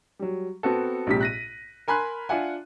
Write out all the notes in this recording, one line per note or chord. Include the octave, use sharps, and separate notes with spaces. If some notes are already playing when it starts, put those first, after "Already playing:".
F#3 G3
B3 C4 F#4 A4
A#1 G#2 C3 G4 B6
F#6 A#6 D#7
A#4 G#5 B5 C6 F#6
D4 F4 E5 F#5 G#5